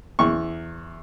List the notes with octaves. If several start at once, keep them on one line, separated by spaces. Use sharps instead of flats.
E2 C#6